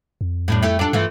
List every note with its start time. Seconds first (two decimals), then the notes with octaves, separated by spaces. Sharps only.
0.21 F2
0.48 A2 G3 D4
0.62 A3 E4 G4
0.79 D4 F4 A4
0.93 G2 E3 A3 F4